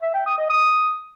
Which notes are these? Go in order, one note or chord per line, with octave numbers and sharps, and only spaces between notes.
E5
G5
D#6
D#5
D#6